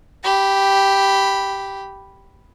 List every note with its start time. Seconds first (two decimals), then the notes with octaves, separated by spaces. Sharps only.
0.23 G4 B5